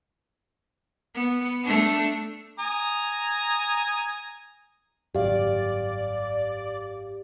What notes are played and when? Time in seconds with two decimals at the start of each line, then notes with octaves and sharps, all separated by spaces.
1.15 B3
1.64 A3 D4
2.59 G#5 A#5 D#6
5.15 G#1 F#2 G4 D5 F5